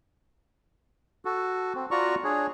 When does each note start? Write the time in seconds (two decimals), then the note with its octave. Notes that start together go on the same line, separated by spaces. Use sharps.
1.25 F#4 A4
1.75 C4
1.91 F4 F#4 D5 A#5 C#6
2.24 D4 G#4 C#5